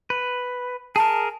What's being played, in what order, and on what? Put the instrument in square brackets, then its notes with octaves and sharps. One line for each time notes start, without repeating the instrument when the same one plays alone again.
[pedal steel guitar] B4
[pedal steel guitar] G#4 A#4 [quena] A5